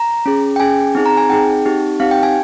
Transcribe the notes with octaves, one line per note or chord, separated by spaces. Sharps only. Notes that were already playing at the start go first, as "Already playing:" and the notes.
Already playing: A#5
C#4 G#4
G5
C#4 G#4 G#5
C4 D#4 G#4
A#5
G#5
C4 D#4 G#4 G5
C4 D#4 G4
C4 D#4 G4 F5
G5
G#5